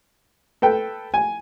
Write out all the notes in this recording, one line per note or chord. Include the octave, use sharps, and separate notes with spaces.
A4 B4 G5
G#5